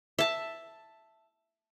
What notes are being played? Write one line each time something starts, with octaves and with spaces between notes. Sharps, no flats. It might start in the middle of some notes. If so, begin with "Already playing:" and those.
E5 A5